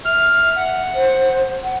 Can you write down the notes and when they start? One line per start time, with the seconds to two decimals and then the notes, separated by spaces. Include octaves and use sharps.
0.05 E5 F6
0.56 F#5
0.95 C5
1.64 F#5